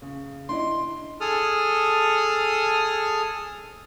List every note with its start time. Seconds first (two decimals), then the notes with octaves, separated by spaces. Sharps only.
0.02 C#3
0.49 D4 E4 D#5 C6
1.21 G#4 A4 D#6 F6